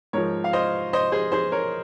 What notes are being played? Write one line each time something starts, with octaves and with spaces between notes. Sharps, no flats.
G#2 F3 A#4 C#5
F5
C5 D#5
C5 D#5
G#4 C5
G#4 C5
A#4 C#5